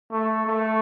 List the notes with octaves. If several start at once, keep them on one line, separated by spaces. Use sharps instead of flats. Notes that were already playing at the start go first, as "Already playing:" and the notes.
A3
A3